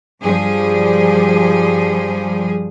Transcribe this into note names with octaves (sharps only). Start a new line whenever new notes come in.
G2 F3 G3 G#4